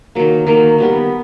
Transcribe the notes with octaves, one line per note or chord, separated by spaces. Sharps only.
D#3 F#3 A#3
D#3 F#3 A#3
D#3 G3 B3